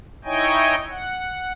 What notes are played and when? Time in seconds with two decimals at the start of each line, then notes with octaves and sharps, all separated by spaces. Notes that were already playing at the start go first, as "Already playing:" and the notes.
0.25 D#4 E4 C#5 D#5 G5 G#5
0.91 F#5